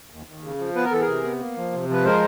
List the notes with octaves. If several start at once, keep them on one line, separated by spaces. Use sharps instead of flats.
D#2
D#2
C#3
F3
B3 B4
A#4
E3 A4
G#4 A#4
C3
B3
A#3
F3
C3
F3 B4
G#3 A#4 C5